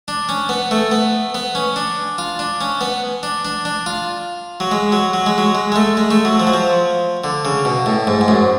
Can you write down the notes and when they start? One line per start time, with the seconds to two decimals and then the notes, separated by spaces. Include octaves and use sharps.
0.08 D4
0.29 C#4
0.49 B3
0.71 A3
0.91 B3
1.35 B3
1.55 C#4
1.76 D4
2.18 F4
2.39 D4
2.61 C#4
2.81 B3
3.23 D4
3.45 D4
3.65 D4
3.86 F4
4.60 F#3
4.71 G#3
4.92 F#3
5.13 F#3
5.26 G#3
5.38 F#3
5.55 G#3
5.72 G#3
5.76 A3
5.97 G#3
6.11 A3
6.25 F#3
6.40 F3
6.47 F#3
6.54 F3
7.24 D3
7.45 C#3
7.65 B2
7.86 A2
8.07 G#2
8.21 G#2
8.28 F#2